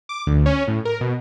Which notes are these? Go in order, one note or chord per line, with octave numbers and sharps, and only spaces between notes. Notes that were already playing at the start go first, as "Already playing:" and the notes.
D6
D2
C#4
A2
A#4
B2